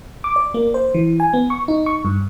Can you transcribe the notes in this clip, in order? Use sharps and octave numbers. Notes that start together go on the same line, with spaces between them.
D6
D5
A#3
C5
E3
G#5
B3
C#6
D#4
C#6
G2